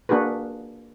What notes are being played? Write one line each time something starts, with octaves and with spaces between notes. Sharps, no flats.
A#3 D4 F#4 G#4 B4